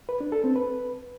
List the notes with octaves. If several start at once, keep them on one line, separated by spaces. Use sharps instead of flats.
B4
D4
A4
C4
B4